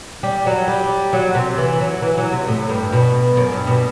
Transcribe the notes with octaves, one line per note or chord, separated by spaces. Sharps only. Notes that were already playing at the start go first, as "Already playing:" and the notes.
G3
F#3
G3
F#3
C3
E3
F#3
E3
F#3
C3
A2
G2
B2
F#2
G2
B2